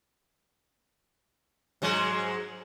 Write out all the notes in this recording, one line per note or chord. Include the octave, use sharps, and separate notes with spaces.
G#2 F#3 G#3